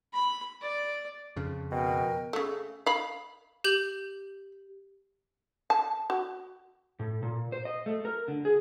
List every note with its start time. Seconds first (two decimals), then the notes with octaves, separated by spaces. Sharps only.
0.13 B5
0.61 D5
1.36 F2 C#3
1.72 B2 A#4 G5 G#5
2.33 C#3 A3
2.86 F5 B5
3.64 G4 G6 F#7
5.70 A5
6.10 F#4
6.99 A2
7.23 A#2
7.52 C5
7.65 D#5
7.86 A3
8.05 A#4
8.28 D3
8.45 G#4